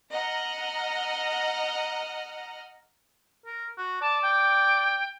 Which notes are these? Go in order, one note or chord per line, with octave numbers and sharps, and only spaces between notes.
D#5 F#5 A#5 F6
A#4
F#4
D5 A5
G5